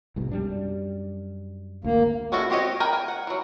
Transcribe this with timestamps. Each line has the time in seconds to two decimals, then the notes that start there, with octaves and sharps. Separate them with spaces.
0.16 C2 G#2 B2
0.31 F#2 G3 D4
1.84 G#1 D2 A#3
2.32 G#3 C#4 E4 F#4 A4
2.50 C4 F#4 G4 C#5 D#5
2.80 A#4 B4 G5 G#5
2.93 G#5
3.08 F#5
3.27 E3 F#3